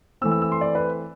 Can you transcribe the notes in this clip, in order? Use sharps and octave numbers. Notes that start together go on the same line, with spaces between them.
E3 A3 C4 E6
E6
E6
C6
D5
B4